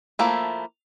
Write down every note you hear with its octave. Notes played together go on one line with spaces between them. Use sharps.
F3 A3 A#3 E4